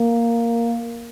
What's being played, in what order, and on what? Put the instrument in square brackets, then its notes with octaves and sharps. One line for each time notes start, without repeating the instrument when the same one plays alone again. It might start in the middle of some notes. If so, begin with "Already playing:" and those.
Already playing: [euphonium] A#3